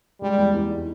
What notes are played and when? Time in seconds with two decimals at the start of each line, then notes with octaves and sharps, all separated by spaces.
0.21 G3 G#3
0.38 E2
0.54 E2
0.70 D#4